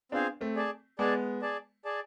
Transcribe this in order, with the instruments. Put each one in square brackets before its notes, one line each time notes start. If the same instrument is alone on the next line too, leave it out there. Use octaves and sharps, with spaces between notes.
[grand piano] B3 D4 [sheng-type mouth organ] C4 F4 G#4 C5 F5
[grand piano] A3 C4
[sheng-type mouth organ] G#4 D5 A5
[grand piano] G#3 B3 [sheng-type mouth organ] G#4 D5 A5
[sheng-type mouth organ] G#4 D5 A5
G#4 D5 A5